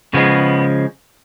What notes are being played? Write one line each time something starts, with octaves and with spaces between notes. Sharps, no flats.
C#3 F3 G#3 B3